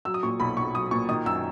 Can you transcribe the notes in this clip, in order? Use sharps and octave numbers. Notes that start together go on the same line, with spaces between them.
F#3 E6
D#6
A#2 C#6
B1 B5
B1 C#6
F#3 D#6
A#2 C#6
D#3 D#6
F#2 E6